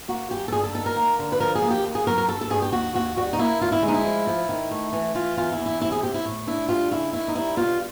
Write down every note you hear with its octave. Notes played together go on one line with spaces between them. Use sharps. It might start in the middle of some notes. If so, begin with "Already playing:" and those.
A#3 F#4
F#2 G4
A4
G2 G#4
A4
D#3 A4
A#4
A#3
D3
B4
F3 A#4
G#4
A#3
G4
D#2
G#4
F#3 A#4
A#4
G2 A4
A4
G2 G#4
G4
D#2 F#4
D#2 F#4
G3 F#4
D#4
A#3 E4
D2 F4
E4
G#3
D#4
E4
F3
F3
D#3
A3
E3
E3 F4
E2 F4
E4
E2
E4
C3 E4
G#4
C3 G4
E4
A2
D4 E4
G3 F4
C#3 E4
D#3 E4
D#4
G3 E4
B2 F4